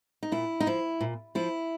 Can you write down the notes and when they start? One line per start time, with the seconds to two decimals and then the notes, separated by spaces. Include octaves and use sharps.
0.23 D#4
0.32 A#2 E4
0.60 D#4
0.66 F3 E4
1.01 A#2
1.35 F3 E4